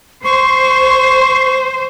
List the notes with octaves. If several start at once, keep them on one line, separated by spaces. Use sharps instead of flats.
C5 C#6